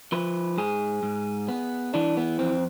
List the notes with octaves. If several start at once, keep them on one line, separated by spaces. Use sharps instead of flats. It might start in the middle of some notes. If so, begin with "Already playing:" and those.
F3 B4
G#2 G#4
G#2
B3
E3 D4
B3
F2 C4